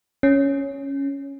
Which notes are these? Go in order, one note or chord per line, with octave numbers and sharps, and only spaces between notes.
C#4